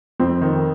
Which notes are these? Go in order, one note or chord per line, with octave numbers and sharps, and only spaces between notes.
F2 C4
D#3